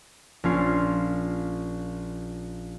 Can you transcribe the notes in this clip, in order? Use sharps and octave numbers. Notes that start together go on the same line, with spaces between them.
A#1 C#4 F4 C7